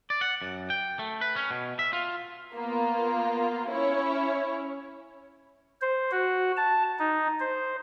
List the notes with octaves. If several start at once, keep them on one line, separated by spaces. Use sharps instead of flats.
D5
F#5
F#2
G5
A3
B4
C#4
B2
E5
F4
A#3 B3 F4
C#4 E4 C#5
C5
F#4
A5
D#4
C5